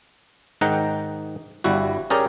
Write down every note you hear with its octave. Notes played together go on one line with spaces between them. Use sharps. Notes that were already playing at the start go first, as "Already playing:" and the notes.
G#2 D#3 D#4 F#5 G5 A#5
G1 G3 E4 F#4
C#4 G4 G#4 A#4 C#5 D5